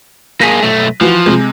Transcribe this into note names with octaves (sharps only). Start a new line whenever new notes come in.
A#3 G#4 A#6 B6 D#7
B1 A3
E3 F3 F#4
C3 G#3